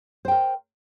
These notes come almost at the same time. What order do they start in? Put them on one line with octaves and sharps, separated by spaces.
C5 G5 A#4